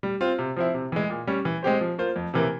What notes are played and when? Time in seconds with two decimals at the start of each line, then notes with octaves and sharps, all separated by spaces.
0.03 G3
0.21 C4 F4
0.39 C3
0.56 F3 C4 E4
0.74 C3
0.92 E3 G#3
1.10 A#2
1.27 G3 C#4
1.45 E3
1.63 G#3 C4 G4 C5
1.81 F3
1.98 A#3 F4 C5
2.16 F2
2.34 C3 E3 A#3